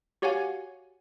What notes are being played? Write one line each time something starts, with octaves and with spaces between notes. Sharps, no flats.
F#4 G4 C#5 F5 F#5 G#5